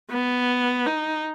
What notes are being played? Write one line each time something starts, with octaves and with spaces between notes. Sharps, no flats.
B3
D#4